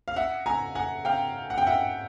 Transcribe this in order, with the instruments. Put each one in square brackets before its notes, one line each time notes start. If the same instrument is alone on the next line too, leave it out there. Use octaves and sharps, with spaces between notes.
[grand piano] F5
E5 F#5
G#5 A#5
F#5 G#5
F5 G5
F#5
G5
E5 F#5